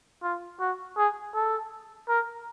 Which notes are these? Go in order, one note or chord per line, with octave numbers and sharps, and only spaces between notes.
F4
F#4
G#4
A4
A#4